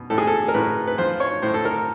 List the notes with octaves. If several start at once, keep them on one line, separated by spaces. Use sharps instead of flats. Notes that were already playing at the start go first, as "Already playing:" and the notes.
Already playing: B2
A2 A4
G#4
A4
A#4
A2 B4
B4
F3 C5
C#5
A2 C5
A4
A#4